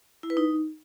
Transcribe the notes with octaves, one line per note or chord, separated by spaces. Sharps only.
E4
B4
D#4